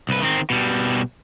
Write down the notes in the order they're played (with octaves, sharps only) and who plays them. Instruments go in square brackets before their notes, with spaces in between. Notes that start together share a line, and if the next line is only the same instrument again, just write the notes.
[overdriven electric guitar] C2 B4
D#3 C4
B2 G3